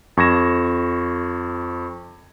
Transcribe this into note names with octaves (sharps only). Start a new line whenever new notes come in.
F2 C#6 G#6 A#6 E7